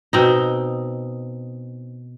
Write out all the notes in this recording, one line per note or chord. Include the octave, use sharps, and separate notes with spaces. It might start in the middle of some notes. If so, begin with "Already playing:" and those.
B2 C4 D#4